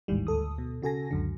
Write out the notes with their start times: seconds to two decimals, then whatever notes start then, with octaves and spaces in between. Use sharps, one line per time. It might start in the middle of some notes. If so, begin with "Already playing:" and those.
0.08 A1 D#2 G#2 D#3 E3 G3
0.27 D2 A4 D#6
0.58 B2
0.82 C#3 F#4 A4 G#5 A#6
1.11 C#2 F#2 D3